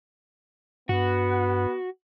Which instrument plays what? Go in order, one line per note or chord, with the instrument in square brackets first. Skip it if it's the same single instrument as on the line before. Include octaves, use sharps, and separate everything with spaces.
[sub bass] G2 [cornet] B3 [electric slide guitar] F#4